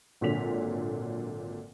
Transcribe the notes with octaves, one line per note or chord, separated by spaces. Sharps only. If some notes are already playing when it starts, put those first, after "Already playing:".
G#1 A#2 D3 F#3 B6 F7